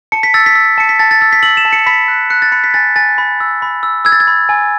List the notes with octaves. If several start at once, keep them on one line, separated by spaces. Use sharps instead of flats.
A5 C#7
B6
E6 A6
B6
E6
A5 C#7
B6
A5 A6
A6
E6 A6
B6
E6 F#7
E7
A5
C#7
B5 B6
F#6
F#6 C#7
A6
B5 C#7
B6
G#5 A6
G#5 A6
B5
E6
B5
E6
E6 G#6
A6
G#6
B5
G#5